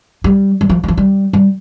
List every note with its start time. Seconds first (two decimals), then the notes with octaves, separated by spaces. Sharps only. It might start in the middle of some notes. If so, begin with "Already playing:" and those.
0.24 G3
0.61 G3
0.69 F3
0.83 G3
0.88 F3
0.97 G3
1.33 G3